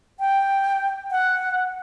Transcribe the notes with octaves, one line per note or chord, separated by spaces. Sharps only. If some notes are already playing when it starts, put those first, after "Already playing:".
G5
F#5